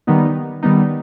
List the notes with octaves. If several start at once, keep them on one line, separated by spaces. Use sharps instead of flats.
D#3 G3 B3 D#4
D#3 G3 B3 D#4